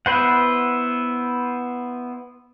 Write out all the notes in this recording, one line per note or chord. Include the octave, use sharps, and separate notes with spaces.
B3 E4 B4 C5 F#5